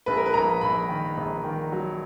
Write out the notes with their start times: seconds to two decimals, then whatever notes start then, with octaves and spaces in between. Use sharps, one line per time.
0.06 A#1 B4
0.17 A#4
0.26 B4
0.34 A#1 A#5
0.61 A#1 B5
0.89 D#3
1.17 A#1
1.44 D#3
1.72 F#3